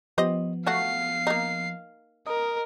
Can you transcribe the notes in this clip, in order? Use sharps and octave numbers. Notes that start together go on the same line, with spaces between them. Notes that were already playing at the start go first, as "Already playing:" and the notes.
F3 B3 G4 C5 D#5
F#3 A3 F#4 F5 C7
A#3 D#4
A#4 D#5